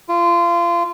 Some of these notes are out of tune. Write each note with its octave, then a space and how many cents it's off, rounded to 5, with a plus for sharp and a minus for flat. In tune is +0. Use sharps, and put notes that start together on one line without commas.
F4 -25